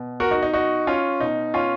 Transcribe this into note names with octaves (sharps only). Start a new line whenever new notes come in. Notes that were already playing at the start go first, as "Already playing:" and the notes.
Already playing: B2
F#4 A#4
D#4 F#4
D#4
D#4 F#4
C#4 F4
B2 D#4
C#4 F4